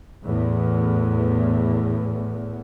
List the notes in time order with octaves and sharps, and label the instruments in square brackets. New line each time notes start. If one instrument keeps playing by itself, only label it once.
[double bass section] E2 A2